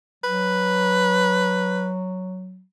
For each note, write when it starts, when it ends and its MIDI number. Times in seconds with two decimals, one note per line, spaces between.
0.24 2.63 54
0.24 1.91 71